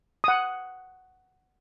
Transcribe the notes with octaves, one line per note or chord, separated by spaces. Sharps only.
F#5 D#6